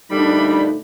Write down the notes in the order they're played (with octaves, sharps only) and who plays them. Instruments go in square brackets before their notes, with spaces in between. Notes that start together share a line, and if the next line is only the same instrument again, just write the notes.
[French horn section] D2 A#2 D#4 [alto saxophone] G3 [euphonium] A3 [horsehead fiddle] D4 B5